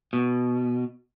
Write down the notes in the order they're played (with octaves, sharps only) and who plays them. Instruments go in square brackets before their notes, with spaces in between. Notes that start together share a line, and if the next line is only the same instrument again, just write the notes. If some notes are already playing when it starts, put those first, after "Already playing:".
[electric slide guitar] B2